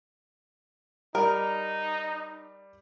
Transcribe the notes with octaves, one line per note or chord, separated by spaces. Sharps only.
G3 D#4 A#4 D5